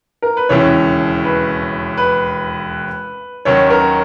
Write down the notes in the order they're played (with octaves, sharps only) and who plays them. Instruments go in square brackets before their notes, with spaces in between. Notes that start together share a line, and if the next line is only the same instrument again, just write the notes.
[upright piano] A#4
B4
[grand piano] E1 D#2 C#3 E3 [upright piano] C#5
[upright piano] B4
B4
[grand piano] D#2 D#3 F#3 C#4 [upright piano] C#5
[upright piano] A#4